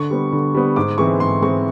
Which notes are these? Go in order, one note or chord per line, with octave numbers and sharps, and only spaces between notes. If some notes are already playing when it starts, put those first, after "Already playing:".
Already playing: D3 C#6
G3 B3
D3
G3 B3
G#2 D6
E3 G#3 C4 C#6
G#2 C6
E3 G#3 C4 C#6